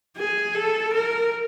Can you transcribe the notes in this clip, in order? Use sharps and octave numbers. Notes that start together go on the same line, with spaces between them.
G#4
A4
A#4